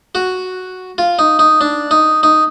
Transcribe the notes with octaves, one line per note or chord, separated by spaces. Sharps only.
F#4
F4
D#4
D#4
D4
D#4
D#4